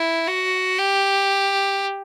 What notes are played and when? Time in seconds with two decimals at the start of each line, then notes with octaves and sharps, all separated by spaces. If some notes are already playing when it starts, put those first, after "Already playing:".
Already playing: E4
0.28 F#4
0.79 G4